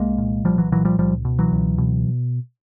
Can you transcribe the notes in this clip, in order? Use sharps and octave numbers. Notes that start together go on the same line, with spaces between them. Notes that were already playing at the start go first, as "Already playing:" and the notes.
Already playing: C2 G#3 A#3
A#2
C2 F3 G3
E3 F#3
A#2 E3 F#3
F3 G3
C#2 F3 G3
B2
E3 F#3
C#2
B2